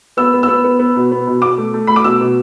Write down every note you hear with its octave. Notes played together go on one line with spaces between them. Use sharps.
B3 E6
B3
E6
B3
B3
B3
B2
B3
B2
B2 D6
A3
A3
A3 B5
D6
B2 E6
B2